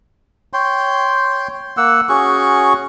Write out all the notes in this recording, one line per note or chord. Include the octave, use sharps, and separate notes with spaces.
C#5 G5 C6
A#3 F#5 E6
C#4 F#4 G#4 C#6